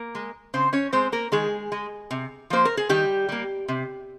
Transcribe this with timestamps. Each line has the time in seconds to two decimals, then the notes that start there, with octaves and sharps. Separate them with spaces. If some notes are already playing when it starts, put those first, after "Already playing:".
Already playing: A#3 A#4
0.15 G#3
0.54 C#3 C4 C5
0.73 C#4 C#5
0.93 G#3 C4 C5
1.12 A#3 A#4
1.32 D#3 G#3 G#4
1.72 G#3
2.11 C3
2.50 F3 A#3 C5
2.65 A#4
2.77 G#4
2.89 D#3 G3 G4
3.29 G3 A#3
3.68 C3